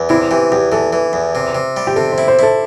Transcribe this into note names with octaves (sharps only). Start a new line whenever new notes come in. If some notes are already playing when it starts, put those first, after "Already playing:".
Already playing: E2
C3 E4
E3 G4
E2 G4
E3 A4
E3
E2
C3
C3
G3
G4
C3 A4
C5
E4
C5
E4 A4